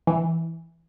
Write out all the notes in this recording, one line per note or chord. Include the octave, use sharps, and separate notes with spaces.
E3